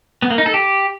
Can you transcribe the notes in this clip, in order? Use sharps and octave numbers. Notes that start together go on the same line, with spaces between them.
B3
A#3
D#4
A4
G4